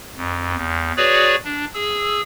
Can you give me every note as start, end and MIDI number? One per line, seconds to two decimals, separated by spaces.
0.16 0.55 41
0.56 0.92 40
0.97 1.36 66
0.97 1.36 68
0.97 1.36 71
0.97 1.36 73
0.97 1.36 74
1.45 1.65 62
1.74 2.21 68
1.74 2.21 88